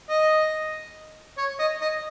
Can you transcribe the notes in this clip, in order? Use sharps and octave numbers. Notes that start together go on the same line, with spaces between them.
D#5
C#5
D#5
D#5